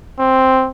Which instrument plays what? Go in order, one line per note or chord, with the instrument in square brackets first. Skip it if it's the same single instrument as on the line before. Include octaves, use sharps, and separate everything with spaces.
[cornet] C4